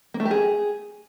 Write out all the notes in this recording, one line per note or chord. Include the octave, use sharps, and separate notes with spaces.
A#3
A3
G4
G#4